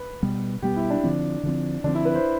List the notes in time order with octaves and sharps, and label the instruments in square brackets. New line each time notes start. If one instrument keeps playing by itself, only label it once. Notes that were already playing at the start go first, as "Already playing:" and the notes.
Already playing: [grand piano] B4
[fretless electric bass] B2 G3 B3
[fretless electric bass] B2 G3 B3 [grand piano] G4
[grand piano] E4
D4
[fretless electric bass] D3 F3 C4
D3 F3 C4
[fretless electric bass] D3 F3 C4 [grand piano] D4
[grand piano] E4
B4
C5